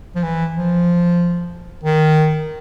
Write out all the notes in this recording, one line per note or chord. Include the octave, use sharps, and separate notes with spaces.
F3
E3
F3
D#3